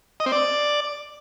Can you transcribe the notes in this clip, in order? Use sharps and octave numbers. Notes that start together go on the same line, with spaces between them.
D#5
C4
D5